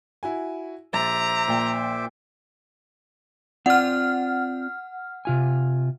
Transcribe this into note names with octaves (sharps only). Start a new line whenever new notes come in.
E4 F#4 G#5
A#1 C5 E5 A#5 D6 A6
A#2 G5
C4 F4 D5 F#5 F6
C3 F4 G#5